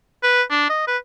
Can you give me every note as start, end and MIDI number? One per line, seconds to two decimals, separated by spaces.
0.23 0.42 71
0.51 0.68 62
0.69 0.84 75
0.87 0.97 71